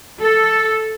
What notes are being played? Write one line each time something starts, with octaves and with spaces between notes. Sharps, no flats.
A4